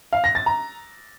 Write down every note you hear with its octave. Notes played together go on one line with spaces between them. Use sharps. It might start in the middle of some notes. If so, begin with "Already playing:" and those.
F5
A#6
A6
A#5